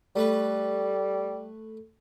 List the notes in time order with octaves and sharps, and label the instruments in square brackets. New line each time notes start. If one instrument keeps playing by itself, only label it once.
[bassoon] G3 [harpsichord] A3 B4